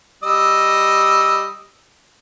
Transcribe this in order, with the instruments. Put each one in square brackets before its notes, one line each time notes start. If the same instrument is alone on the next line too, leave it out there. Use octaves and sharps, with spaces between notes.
[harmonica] G3 D#5 E6